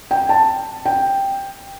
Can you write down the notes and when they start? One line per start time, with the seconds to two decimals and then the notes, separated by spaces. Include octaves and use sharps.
0.11 G5
0.29 A5
0.86 G5